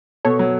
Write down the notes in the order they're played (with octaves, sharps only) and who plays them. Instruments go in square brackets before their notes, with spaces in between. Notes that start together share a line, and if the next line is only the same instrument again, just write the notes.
[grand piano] B2 [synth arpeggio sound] A4 C#5
[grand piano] F#3